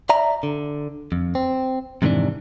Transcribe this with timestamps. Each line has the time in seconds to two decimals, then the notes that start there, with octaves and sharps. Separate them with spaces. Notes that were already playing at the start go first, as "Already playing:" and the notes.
0.09 D5 E5 A#5
0.43 D3
1.12 F2
1.35 C4
2.02 F2 G#2 C3 D#3 E3 D4